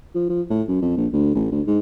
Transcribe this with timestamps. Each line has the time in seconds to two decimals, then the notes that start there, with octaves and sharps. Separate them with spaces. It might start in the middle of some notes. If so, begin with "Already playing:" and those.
0.15 F3
0.29 F3
0.50 A2
0.68 F#2
0.82 F2
0.97 A#1
1.13 D2
1.35 A1
1.52 D2
1.67 G#2